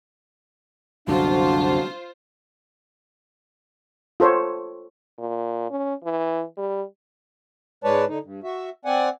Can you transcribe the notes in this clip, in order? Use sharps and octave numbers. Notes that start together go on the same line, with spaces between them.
C2 F#2 D3 D4 F4 F#4 C5
F4 A4 C5 C#5
A#2
C#4
E3
G3
G#2 G#3 B4 C#5 D5 A5
D3 D#4
G2
F#4 E5
C4 D5 F#5 G#5